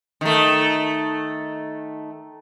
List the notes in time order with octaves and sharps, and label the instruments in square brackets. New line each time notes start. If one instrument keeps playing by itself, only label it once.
[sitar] D#3 A3